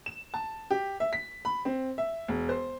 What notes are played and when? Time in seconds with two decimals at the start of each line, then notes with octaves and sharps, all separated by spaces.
0.06 E7
0.34 A5
0.71 G4
1.00 E5
1.13 B6
1.45 B5
1.65 C4
1.98 E5
2.28 E1
2.49 C5